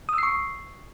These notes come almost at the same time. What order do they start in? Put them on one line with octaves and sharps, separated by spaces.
D#6 E6 C7 C#6